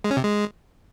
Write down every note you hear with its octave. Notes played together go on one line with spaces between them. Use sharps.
G#3
C#4
C3
G#3